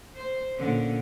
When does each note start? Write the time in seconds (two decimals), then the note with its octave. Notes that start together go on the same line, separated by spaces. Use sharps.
0.16 C5
0.56 A#2 D3 C#4